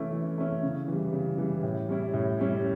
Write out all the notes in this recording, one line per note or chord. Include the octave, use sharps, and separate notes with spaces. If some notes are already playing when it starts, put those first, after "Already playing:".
Already playing: E3 A3 C#4 E4
E3
A3 C#4 E4
C#3
E3 G3
C#3
E3 G3
A2
G3 C#4 E4
A2
G3 C#4 E4